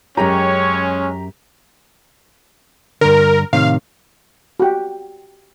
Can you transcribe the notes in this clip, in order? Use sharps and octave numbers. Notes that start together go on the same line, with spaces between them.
F#2 G#3 C#4 G4 C#5 G5 G#5 A#5
G2 D3 A#4
A2 C3 D#3 F5
F#4 G4